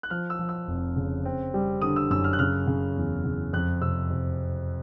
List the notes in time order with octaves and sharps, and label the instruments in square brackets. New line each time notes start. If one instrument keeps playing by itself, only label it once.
[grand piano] F#6
F3 F6
E6
F3
E6
F1
C#3
C4
G3
D3 D#6
E6
F#2 E6
F6
F#6
C#3 F6
C#3
E2
C#3
F2 F#6
C3 E6
C3